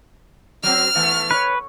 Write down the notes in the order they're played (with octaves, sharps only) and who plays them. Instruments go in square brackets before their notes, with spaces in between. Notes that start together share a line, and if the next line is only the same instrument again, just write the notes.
[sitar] F#3 C4 [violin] F6
[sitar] E3 A3 B3
[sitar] D#4 C#5 [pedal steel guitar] B4